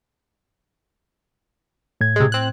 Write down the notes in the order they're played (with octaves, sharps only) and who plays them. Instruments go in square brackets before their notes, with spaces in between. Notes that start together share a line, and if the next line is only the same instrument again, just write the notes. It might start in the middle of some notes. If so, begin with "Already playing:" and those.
[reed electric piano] A2 G#6
[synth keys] C3 G#3
C4 F#6